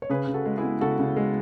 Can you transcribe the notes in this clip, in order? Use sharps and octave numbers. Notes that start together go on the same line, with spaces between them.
C#5
C#3 G#4 B4
C#3
F#4 A4
G#3
E4 G#4
B3
C#3 F#4 A4
C#3
G#3